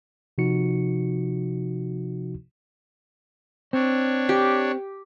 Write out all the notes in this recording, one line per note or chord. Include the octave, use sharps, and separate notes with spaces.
C3 F3 D#4 F#4 C#7
C4 D4 C#5
G4